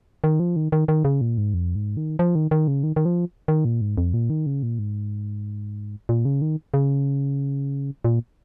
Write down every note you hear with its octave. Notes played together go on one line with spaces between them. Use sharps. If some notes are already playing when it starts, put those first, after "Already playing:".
D#3
F3
D#3
D#3
D#3
C#3
A#2
G#2
F2
G#2
D#3
F3
D#3
D#3
C#3
D#3
D#3
F3
D#3
A#2
G#2
F2
A#2
D#3
C#3
A#2
G#2
A#2
C#3
D#3
C#3
A#2